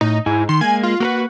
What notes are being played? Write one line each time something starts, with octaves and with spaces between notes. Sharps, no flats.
A2 D#4
G#2 E4 G#5
D#3 C6
G#3 A#3 G#5
F4
A#3 F#4 A#4 B4